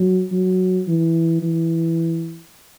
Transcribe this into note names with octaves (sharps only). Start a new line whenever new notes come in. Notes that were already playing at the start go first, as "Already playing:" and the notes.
Already playing: F#3
F#3
E3
E3